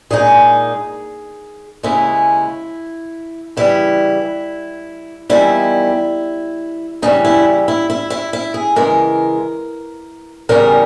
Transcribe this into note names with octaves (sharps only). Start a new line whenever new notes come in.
A#2 G#3 D#4 G#4
D#2 C#3 G#3 C#4 E4
C#3 E3 G3 E4
E2 D#3 G3 E4
C#3 E3 G3 C#4 D#4
E4
E4
E4
E4
E4
G#4
C#3 E3 G#3 A#4
E2 C#3 G3 C#4 A#4